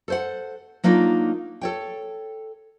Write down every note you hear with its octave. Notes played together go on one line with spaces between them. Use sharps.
A4 C5 F#5
F#3 A#3 D4 D#4 F4
A4 C#5 G5